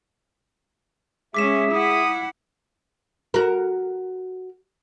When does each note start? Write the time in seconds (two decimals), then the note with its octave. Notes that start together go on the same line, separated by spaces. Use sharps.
1.34 G#3 C#4 G#4 E5 D6 B6 E7
1.72 E4 F#5 D#6
3.34 F#4 A#4